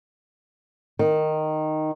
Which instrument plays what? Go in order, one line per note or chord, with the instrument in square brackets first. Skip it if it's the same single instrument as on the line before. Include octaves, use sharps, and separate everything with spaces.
[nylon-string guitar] D#3